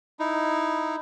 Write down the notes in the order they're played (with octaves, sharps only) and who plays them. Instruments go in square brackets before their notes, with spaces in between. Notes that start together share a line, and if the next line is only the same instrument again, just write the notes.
[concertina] D#4 E4